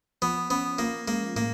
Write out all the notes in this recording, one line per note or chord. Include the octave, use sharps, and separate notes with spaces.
F3 B3
B3 C#4
A#3 F4
G#3 A#3
A2 A#3